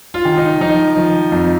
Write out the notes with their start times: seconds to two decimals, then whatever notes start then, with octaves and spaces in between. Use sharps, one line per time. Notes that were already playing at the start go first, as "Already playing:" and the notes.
0.14 F4
0.25 D#3
0.37 D#4
0.61 F3 D#4
0.97 F3
1.32 F2